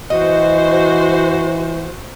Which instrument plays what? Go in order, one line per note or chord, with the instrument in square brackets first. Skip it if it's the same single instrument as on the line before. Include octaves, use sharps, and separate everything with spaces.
[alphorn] E3 [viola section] F#4 C5 [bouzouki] D#5